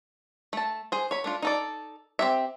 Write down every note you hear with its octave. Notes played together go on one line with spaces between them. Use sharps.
A3 A5
G#4 C5
C#5 B5
A3 D4 F4
D#4 A4 D5
C4 G4 E5